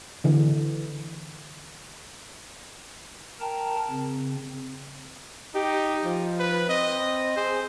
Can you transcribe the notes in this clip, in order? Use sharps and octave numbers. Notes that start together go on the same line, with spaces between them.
D3 E3
A#4 G5 A5 A#5
C#3 C4
D#4 G4
F3
B4
C4 D#5
G#4 C5